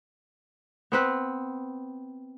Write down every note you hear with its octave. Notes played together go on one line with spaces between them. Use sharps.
B3 C4 B4